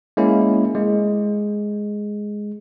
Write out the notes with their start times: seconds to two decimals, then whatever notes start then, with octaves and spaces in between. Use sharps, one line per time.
0.17 G#3 A#3 C#4 E4
0.75 G#3